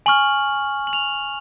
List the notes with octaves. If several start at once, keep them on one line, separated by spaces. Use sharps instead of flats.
G#5 C#6 F6 F#7
F#7
F7